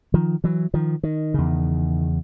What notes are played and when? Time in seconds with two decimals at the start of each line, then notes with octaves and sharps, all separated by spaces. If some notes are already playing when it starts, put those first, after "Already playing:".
0.14 D#3 F3
0.44 E3 F#3
0.74 D#3 F3
1.03 D#3
1.34 E2 C#3